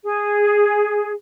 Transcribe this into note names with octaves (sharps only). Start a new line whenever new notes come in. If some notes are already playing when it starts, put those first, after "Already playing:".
G#4